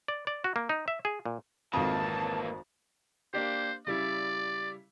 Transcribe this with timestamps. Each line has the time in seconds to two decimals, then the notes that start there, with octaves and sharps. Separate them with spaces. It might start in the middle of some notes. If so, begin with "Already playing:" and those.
0.08 D5
0.27 D5
0.44 F#4
0.56 A#3
0.69 D#4
0.88 E5
1.05 G#4
1.26 A#2
1.73 G#1 F2 E3 A#3 A5 D#6
3.34 A#3 D4 G4 C5
3.87 C#3 G3 E4 D5